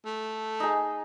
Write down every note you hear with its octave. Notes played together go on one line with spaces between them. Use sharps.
A3
D#4 G#4